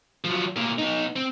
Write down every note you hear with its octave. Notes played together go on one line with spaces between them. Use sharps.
F3 F#3
A2 A#3
B3 D#4
C4